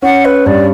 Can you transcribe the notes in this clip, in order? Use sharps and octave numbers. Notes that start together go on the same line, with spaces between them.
C#4 F#5
B4
G2 D5